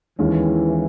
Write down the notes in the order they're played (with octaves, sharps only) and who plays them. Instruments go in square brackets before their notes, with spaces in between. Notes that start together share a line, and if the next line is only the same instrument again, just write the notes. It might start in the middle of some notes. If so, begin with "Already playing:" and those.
[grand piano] D#2 D#3 G#3 C#4 E4 [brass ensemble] E3